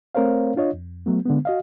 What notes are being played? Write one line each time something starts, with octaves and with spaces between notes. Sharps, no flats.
A3 C4 A#4 C5 C#5 F5
D4 F4 C#5 D#5
F2
F#3 A3 B3
D3 G#3 B3
F#4 D#5 F5